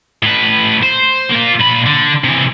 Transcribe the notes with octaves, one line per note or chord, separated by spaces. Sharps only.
A2 B4
C5
A#3 F4
A#2 B5
D3
C3 E3